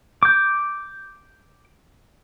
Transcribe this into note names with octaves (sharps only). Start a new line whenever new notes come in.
D6 G6